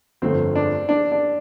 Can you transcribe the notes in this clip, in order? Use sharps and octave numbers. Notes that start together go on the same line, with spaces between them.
G1 F2 D3 A3 C4
D4
D4
D4